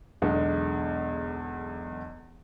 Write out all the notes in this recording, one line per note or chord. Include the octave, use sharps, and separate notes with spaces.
B1 E2 D3 G#3